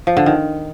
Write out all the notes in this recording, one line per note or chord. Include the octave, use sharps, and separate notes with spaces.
F3
D3
D#3